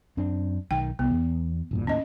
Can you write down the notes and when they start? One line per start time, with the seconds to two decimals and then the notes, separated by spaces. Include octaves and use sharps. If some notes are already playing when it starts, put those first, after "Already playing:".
0.17 F#2 C4 D4
0.71 B1 D#3 G5
0.99 C2 B3
1.11 E2
1.71 E1 G2 A#2
1.87 D#2 A2 C#4 D#5